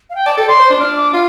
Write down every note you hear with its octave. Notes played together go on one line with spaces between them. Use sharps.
F5
G5
D5 A5
A4 G5
D5 C6
C5
D4
D4 F6
D6
F4 F6